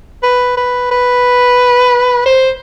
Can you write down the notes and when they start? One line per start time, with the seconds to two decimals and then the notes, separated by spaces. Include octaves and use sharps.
0.23 B4
0.57 B4
0.91 B4
2.26 C5